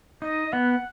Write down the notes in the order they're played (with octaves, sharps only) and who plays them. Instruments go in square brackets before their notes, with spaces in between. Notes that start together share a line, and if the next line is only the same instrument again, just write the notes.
[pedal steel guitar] D#4 [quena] D#5
[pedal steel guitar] B3 [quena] F#5